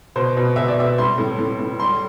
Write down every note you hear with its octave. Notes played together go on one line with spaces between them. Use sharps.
B2 C5
B2
B2 E5
D5
B2 E5
G3 C6
A2
A2
A2
G3 C6